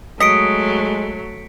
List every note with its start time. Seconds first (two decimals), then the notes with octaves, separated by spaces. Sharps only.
0.20 F#3 G#3 A3 D#5 B6 C#7 D7